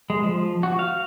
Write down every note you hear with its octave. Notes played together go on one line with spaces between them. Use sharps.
G#3
F3
F#4
F5